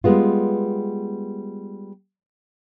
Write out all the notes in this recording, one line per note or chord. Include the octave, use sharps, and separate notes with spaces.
G3 G#3 B3 F4